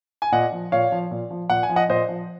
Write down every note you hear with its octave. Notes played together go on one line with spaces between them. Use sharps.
G#5
A#2 D#5 F#5
F3
A#2 C#5 F5
F3
A#2
F3
A#2 F#5
G#5
F3
D#5 F#5
A#2 C5 D#5
F3